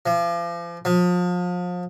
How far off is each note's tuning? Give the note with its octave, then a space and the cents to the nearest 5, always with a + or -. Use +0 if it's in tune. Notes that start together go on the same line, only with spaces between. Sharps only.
F3 -35
F3 +35